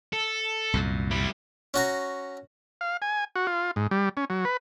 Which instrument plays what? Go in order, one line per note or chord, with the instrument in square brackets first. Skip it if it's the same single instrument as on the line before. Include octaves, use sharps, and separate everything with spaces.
[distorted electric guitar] A4
[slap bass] C2 F#2 A#2
[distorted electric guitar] G3 E4
[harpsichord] C#4 F#4 A#5
[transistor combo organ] F5
G#5
F#4
F4
G#2
G3
C#4
F#3
B4